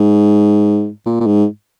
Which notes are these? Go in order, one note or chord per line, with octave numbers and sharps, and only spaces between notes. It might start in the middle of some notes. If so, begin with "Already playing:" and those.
Already playing: G#2
A#2
A#2
G#2